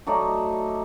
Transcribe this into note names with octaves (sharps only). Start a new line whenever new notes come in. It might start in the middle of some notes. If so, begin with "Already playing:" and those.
F#3 A3 D#4 D5